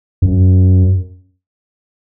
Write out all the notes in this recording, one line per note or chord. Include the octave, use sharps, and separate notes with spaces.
F#2